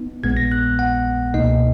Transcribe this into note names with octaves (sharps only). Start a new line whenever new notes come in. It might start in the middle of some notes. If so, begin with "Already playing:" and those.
Already playing: B3 D#4
A#1 A#2 G#3 B3 G#6
A#6
F#6
F#5
C#2 B2 A#3 D#4 D#5